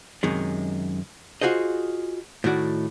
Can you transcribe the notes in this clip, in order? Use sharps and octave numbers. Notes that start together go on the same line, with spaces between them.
F#2 C3 D#3 G#3
F4 F#4 G#4 C5 D#5
A2 D#3 F#4 D5